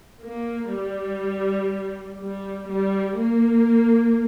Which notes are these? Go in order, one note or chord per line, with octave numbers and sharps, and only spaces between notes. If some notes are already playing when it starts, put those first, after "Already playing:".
A#3
G3
G3
G3
A#3